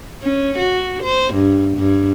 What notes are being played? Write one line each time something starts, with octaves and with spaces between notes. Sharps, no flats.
C#4
F#4
C5
G2
G2